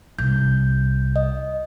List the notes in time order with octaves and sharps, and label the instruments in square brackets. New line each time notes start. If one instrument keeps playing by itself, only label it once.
[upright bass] C2 [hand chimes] G6
[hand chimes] D#5